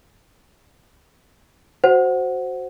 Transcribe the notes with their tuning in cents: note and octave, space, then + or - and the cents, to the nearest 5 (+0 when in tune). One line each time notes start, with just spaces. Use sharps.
F#4 +0 C5 +0 F#5 +0